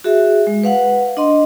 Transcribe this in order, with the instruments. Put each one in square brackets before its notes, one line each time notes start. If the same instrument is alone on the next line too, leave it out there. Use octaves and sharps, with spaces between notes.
[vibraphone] F#4 G#4 E5
G#3
B4 F5 F#5
D4 D#5 C6